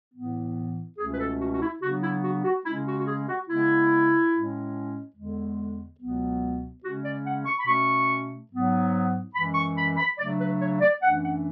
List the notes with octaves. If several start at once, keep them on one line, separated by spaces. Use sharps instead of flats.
A2 E3 B3
C#2 B2 A3 C#4 G#4
B4
A4
F#4
F#4
E4
C#3 F#3 B3 D4 F#4
E4
F#4
F#4
C#3 G#3 C#4 E4
F#4
F#4
G#4
F#4
C#3 G#3 B3 E4
A2 G#3 C#4
E2 D3 G#3
C#2 B2 F#3 B3
C#3 G#3 C#4 F#4
D5
F#5
C#6
B5
B2 A3 C#4 C#6
G#2 F#3 B3
F#2 E3 G#3 B5
C#6
B5
B5
C#3 F#3 A3 D4 D5
B4
C#5
D5
F#2 E3 A3 D4 F#5
F#5